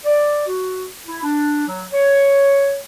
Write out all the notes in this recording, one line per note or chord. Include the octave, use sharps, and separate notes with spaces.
D5
F#4
E4
D4
F#3
C#5